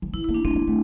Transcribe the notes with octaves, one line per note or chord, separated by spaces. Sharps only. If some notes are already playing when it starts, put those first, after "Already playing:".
F3
E3 E4
A#3 E4
D4
A3 C4
A#3
A3